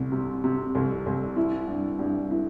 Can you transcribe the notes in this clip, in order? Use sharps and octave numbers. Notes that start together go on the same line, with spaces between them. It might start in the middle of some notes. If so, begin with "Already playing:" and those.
Already playing: C2 C3
C3
C3
C2
C2
E4
G2
G2
E4